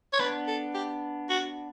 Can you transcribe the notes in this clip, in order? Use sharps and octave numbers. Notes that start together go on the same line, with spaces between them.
C#5
B3 D4 B4
A4
G4
F#4